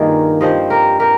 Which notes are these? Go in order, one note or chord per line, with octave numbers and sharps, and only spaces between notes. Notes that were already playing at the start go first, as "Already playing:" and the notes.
Already playing: G2 D#3 A#3 F4 G#4
G2 F3 C4 C5 D#5
G4 A#4
G4 A#4